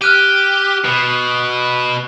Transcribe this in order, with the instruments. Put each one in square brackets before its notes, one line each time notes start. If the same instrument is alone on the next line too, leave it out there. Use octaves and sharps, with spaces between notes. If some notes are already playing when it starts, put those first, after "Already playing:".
[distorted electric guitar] G4 [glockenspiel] F6 F#6 D#7
[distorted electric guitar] B2